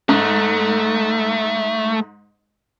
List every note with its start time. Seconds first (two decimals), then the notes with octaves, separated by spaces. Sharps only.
0.09 G#2 A3